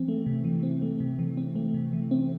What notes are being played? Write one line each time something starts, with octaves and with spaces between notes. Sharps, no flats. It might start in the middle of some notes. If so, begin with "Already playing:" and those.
Already playing: E3 C4
A3
C3
E3
C4
A3
C3
E3
C4
A3
C3
E3
C4